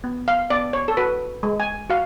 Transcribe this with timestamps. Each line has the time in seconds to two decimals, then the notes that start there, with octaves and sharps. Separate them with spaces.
0.04 B3
0.28 F5
0.50 B3 D5
0.73 C#5
0.88 A4
0.97 F#4 B4
1.43 G#3
1.60 G#5
1.90 F#4 F5